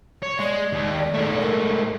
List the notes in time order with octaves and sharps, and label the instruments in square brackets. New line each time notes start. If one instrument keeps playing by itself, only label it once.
[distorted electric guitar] C#5
[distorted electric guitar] G#3 [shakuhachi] D5
[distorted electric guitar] D#2
G#2 A3
[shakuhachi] A#4